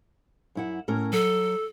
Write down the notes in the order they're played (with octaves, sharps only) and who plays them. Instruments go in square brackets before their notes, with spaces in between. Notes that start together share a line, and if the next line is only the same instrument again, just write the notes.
[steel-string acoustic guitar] F#2 E4 F#5
A2 C#4 A#4
[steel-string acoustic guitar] F#3 [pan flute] A4